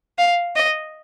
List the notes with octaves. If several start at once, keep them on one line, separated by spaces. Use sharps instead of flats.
F5
D#5